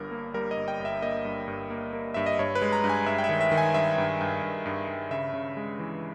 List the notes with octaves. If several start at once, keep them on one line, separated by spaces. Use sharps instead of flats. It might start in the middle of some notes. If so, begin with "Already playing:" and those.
Already playing: G1 G2 A#4
A#3
G3 A#4
D#5
G1
G5
G1
E5
A#3 D#5
G2
G2
A#3
A#3
G2 E5
D#5
G2 C#5
B4
G#3
A#5
G2
G#5
G2 E5
G5
E5
D#3
E5
D#3
G#5
G2 E5
G2
G2
G2
G2
G2
C#3 E5
C#3
G#3
E3